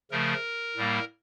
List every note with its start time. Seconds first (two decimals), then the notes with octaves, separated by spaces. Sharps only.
0.11 C#3 F3 A3 A#4
0.76 A2 G3 A#3